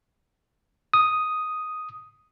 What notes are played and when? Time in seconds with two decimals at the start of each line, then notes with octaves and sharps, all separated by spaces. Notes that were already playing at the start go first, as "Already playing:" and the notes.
0.94 D#6